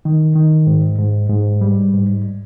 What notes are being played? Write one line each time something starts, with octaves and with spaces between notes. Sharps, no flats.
D#3
D#3
G#2
G#2
G#2
G3
G#2